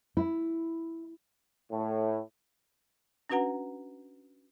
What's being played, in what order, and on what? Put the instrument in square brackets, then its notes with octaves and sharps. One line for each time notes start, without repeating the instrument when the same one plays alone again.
[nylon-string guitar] E4
[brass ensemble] A2
[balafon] C#4 D4 F#4 B4 F#5 A#5